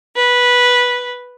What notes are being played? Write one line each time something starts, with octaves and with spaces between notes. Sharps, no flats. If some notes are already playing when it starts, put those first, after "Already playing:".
B4